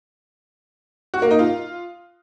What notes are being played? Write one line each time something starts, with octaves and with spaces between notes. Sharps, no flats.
F#4
A#3
D#4
F4